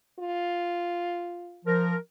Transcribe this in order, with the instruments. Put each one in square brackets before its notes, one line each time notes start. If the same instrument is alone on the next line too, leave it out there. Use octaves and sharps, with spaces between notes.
[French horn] F4
[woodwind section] F3 A#4